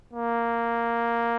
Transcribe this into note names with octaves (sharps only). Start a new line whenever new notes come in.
A#3